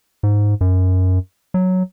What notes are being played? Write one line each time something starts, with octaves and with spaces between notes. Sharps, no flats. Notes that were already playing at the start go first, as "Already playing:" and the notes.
G#2
F#2
F#3